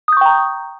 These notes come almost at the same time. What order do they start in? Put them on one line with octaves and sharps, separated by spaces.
D#6 G6 C#6 G5 A#5